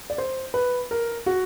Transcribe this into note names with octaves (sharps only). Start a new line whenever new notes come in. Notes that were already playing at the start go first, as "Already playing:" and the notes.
D5
C5
B4
A#4
F#4